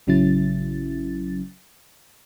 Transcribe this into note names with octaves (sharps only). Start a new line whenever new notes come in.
A1 C#3 F#3 C#4 E4 A6